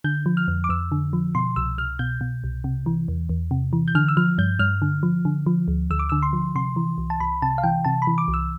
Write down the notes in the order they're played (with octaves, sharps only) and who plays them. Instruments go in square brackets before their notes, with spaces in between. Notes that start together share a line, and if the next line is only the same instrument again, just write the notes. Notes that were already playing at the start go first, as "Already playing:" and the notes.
[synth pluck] D3 G6
F3
F6
F2
D6
F2 E6
D3
F3
B2 C6
C2 E6
C2 F6
B2 G6
B2
C2
C3
E3
E2
E2
C3
E3
G6
D3 F6
E6
F3 F6
G2 G6
G2 F6
D3
F3
D3
F3
D2
D2 E6
D6
D3 E6
C6
F3
C3 C6
E3
C2
A5
C2 B5
C3 A5
F5
E3 G5
C3 A5
B5
E3
D6
C2
E6